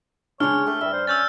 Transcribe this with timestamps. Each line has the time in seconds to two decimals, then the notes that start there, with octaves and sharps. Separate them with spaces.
0.40 C#3 G#3 D4 C#5 F6
0.67 A3 G4
0.81 G2 E5
0.93 C5
1.07 C#4 E6 G6 A6